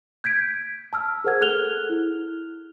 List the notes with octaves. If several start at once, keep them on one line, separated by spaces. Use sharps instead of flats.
G6 G#6 B6 D7
A5 E6 F6
G#4 A#4 C5 F#5 F6 G#6
G#4 A4 F6 F#6 F7 G7
E4